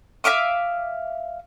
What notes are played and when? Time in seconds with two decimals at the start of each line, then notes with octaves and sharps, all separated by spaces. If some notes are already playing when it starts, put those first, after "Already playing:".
0.24 E5 F5 D6 D#6